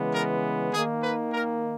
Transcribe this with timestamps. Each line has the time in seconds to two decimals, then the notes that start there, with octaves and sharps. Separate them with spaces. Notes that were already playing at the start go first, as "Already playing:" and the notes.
Already playing: C#3 E3 G#3 B3
0.14 A#4
0.73 D#3 A#3 G#4
1.03 B4
1.33 A#4